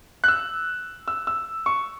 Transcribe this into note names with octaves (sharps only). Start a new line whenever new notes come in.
F#6
E6
E6
E6
C#6